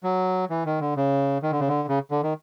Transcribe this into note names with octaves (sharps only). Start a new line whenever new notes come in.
F#3
E3
D#3
D3
C#3
D#3
D3
C#3
D3
C#3
D3
D#3